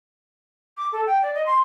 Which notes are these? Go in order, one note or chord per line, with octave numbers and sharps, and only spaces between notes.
D6
A4
G5
D5
D#5
C6